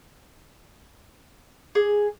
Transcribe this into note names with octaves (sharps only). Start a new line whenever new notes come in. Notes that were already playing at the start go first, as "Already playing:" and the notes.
G#4